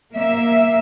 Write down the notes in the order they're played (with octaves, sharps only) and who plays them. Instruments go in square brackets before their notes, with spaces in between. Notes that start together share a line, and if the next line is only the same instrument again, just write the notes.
[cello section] A#3 E5